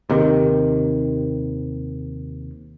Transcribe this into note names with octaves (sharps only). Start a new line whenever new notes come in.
D#2 C3 D#3